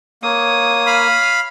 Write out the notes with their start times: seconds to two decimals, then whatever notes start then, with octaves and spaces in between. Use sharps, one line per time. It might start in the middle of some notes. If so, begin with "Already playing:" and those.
0.23 A#3 C#5 D#6
0.86 F5 B5